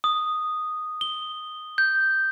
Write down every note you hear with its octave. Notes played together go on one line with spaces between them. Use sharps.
D#6
G7
G6